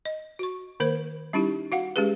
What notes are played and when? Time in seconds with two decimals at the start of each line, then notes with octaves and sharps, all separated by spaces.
0.05 D#5
0.39 F#4 C#6
0.80 D#3 A#3 A#4 C5
1.33 G3 C#4 D#4 E4 G4
1.72 F#4 F5 F#5
1.96 G#3 C#4 G4 G#4 B4